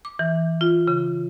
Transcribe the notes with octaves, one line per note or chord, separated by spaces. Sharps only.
D6
E3
F4
C#3